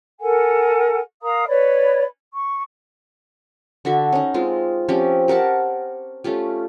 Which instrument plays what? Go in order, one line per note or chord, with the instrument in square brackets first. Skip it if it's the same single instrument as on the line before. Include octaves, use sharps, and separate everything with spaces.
[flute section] A4 A#4 F#5 G#5
A#4 F5 A#5 D#6
B4 C#5 D5 B5
C#6
[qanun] D3 D4 F#4 E5
C#4 D#4
G#3 C4 F4
F3 C4 C#4 G4
G4 A#4 F#5 A5
A3 C#4 F4 G4